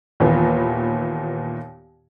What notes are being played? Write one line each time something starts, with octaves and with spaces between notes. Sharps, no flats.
D#2 A#2 E3 B3